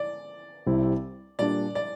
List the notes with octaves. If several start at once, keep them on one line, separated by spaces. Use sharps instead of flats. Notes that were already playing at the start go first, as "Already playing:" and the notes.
Already playing: D5
C2 C3 G3 C4 E4
A#2 G3 D4 D5
D5